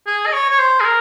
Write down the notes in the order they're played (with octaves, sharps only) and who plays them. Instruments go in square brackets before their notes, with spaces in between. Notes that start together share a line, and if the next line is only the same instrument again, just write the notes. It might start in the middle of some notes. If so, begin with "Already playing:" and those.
[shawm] G#4
D#5
C#5
C#5
C5
G#4
A#4